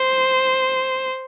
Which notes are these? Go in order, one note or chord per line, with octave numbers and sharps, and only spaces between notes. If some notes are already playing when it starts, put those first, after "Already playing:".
Already playing: C5